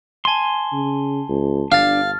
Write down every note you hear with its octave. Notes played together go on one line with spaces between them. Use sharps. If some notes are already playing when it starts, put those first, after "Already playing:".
G#5 A5 C6 G7
C#3
C#2
G1 D4 F5 F6 A6